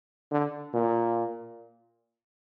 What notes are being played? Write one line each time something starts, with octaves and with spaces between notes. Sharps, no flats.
D3
A#2